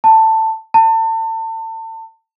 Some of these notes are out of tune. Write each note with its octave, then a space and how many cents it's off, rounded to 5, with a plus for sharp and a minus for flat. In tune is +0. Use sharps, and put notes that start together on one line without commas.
A5 +15
A5 +35